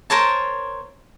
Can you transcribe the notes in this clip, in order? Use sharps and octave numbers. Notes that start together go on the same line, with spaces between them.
A#4 C5 C#5 A5